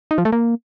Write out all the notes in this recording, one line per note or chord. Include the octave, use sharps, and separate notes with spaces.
D#4
F3
A3
A#3